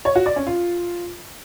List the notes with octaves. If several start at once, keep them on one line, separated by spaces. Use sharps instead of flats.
C#5
F#4
D5
C#4
F4